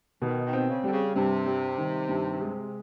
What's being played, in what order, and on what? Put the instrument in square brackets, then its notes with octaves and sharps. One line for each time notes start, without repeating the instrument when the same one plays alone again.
[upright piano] B2 [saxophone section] D#3
[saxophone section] D#3
[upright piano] C4
[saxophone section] C#3
[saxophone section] D3 [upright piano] G3
[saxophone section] C#3
[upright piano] G2 [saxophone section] C3
[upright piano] G3
D#3
G2
G#3